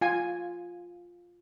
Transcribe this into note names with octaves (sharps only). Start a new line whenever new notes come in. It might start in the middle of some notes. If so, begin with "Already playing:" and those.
F4 G#5